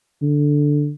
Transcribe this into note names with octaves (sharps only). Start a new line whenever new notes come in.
D3